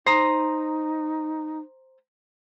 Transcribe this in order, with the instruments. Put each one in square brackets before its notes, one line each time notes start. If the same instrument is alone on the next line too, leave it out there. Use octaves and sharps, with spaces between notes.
[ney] D#4 [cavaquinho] C5 A#5 D#6